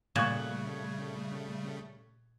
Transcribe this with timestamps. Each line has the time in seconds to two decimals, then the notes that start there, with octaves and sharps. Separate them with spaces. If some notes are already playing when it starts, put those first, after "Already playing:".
0.16 A#2 C#3 G3 A3 C#6 F#6 G#6